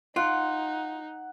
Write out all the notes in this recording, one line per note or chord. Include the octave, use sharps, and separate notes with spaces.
D#4 F4 F#5